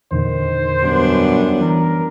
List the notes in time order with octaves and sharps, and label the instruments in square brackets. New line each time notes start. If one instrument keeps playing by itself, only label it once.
[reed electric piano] E2 A#2 D3 [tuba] D#3 [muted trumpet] C5
[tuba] F#2 [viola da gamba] G3 B3 D4
[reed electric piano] E3 [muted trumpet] A#4